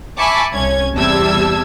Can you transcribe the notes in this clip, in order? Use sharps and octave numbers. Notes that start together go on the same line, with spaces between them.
E5 G#5 A5 B5 C#6 D6
C2 C#4 G#6
E2 C3 G3 A5 E6 G#6